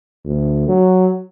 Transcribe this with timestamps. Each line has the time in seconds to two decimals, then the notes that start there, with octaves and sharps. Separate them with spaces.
0.25 D2
0.68 F#3